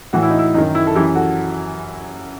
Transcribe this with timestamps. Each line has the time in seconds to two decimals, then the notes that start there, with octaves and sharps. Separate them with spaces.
0.13 A2 E3 F#4
0.23 E4
0.30 D#4
0.39 E4
0.54 F#2 D#3 D#4
0.75 E4
0.87 A4
0.95 F#2 E3 E4 G4
1.15 F#4 A4